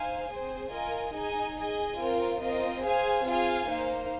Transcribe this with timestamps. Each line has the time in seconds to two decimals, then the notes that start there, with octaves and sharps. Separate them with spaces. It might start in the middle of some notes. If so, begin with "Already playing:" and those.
Already playing: D#4 C5 F5 G#5
0.29 C4 G#4 C5
0.71 F4 A#4 D#5 G#5
1.14 D#4 G#4 D#5 G#5
1.56 G#4 D#5 G#5
1.98 C4 F4 A#4
2.40 C4 F4 A#4 D#5
2.82 G#4 C5 F5 G#5
3.26 C4 F4 G#4 F5 G#5
3.68 A#3 D#4 C5 F5